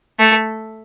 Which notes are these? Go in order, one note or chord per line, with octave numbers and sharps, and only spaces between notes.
A3